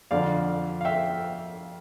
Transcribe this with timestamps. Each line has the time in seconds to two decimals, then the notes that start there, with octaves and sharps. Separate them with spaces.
0.11 F2 D3 F3 D5 F5
0.81 F5
0.85 E5 G5